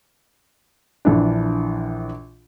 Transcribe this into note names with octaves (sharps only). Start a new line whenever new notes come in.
A#1 E3 D4